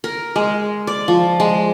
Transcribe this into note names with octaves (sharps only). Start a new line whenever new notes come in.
A#4
G#3
D5
F3
G#3